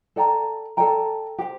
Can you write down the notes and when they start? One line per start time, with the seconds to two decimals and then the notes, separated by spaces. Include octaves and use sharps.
0.16 A4 D5 G5 A#5
0.77 A4 D5 G5 A#5
1.38 G4 C5 G5